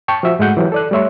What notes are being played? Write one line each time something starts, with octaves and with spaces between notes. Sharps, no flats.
G5 A5 C#6
F3 F#4 E5
G#2 G#3 A3 F#4 F#5 G6
E3 F#3 G4
A4 D5 F#6
G3 A3 C#5 E5 C6